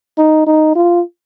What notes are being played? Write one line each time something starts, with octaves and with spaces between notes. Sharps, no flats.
D#4
D#4
F4